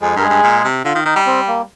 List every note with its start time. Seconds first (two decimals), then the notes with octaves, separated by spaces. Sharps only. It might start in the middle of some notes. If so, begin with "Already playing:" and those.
0.02 F2 G#3 G#4
0.16 G2 A#4
0.22 G#3 G#4
0.30 G2
0.43 A#2
0.64 C3
0.85 D3 F4
0.95 D#3
1.05 D#3 D#4
1.16 G3
1.26 C4
1.47 A#3